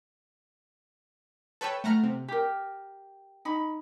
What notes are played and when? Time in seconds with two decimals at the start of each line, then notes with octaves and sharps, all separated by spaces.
1.61 A4 B4 C#5 G5 E6
1.84 A3 F#5 A#5 F6
2.04 C3
2.28 G4 A#4
3.45 D#4 B5